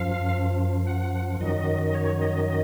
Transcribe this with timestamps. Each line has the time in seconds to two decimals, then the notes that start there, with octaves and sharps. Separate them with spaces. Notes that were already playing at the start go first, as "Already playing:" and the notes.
Already playing: F#2 F3 F5
0.87 F#5
1.41 F#2 D#3 F#3 D#5
1.87 D#5
1.94 C#5
2.21 D#5
2.48 D#5